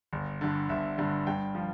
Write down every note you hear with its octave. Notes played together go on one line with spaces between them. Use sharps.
G1
G2 D3
G1 E5
G2 D3
G2 G5
F3